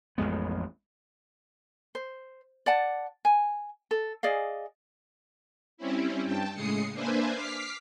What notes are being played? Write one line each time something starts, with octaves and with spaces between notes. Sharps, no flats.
A1 F2 G#3 B3
C5
D5 F#5 A5
G#5
A4
G#4 D5 D#5 F5
G3 C4 C#4 E4
G2 G5 A5
A2 C#3 G#3 D#6 C7 C#7
A#3 D4 B4 C5 E5 G#5
D6 F6 B6 C7